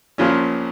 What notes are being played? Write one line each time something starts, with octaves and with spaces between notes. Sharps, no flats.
A#1 A#2 F3 C#4 F4